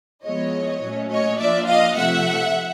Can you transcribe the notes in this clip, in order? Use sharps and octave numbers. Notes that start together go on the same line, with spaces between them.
F3 G#3 B3 E4 C#5 D#5
A#2 F#3 A3 C#4
C#5 D#5
F3 A#3 D4 F4 D5 E5
D#5 F5
C3 F3 A3 E5 F#5